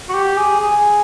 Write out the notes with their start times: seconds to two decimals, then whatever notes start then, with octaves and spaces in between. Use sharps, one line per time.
0.09 F#4
0.14 G4
0.37 G#4
0.61 G#4